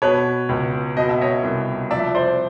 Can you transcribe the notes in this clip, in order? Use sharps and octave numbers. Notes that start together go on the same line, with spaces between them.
B2 B4 C#5
C#2
B2 D#5
E5
C#5 D#5
C2
F3 D5 E5
C5 D5